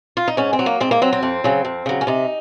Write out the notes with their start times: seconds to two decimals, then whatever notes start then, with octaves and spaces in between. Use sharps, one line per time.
0.17 F4
0.28 D#4
0.37 G#2 C#4
0.53 C4
0.59 F#3
0.66 A#3
0.80 G#2 C4
0.91 A#3
1.02 F#3 C4
1.13 C4
1.23 F2
1.44 C#3 F#3
1.65 F2
1.86 C#3 F#3
2.01 C#4
2.07 C3 D#4